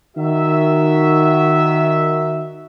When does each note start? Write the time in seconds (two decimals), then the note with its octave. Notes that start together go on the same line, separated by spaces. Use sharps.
0.17 D#3 F#4 E5